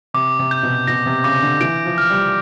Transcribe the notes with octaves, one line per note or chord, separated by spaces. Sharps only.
C3 D6
C3
G6
B2
B2 A#6
C3
C#3 D6
D3
E3 D7
F3
F6
G3